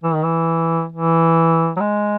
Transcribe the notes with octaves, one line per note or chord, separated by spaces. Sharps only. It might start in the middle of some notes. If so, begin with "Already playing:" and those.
E3
D#3
E3
E3
F#3
G#3